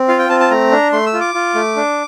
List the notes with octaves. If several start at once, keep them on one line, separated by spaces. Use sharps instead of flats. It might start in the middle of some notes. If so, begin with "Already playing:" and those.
Already playing: C4
F4 F5
G5
C4 A5
A5
A3 A#5
D4
A3 C6
E6
F4
D6
F4
A3
D4